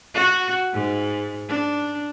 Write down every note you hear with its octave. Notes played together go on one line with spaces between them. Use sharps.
F#4
G#2
D4